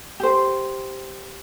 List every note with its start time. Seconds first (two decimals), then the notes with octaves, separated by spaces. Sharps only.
0.20 G4 C5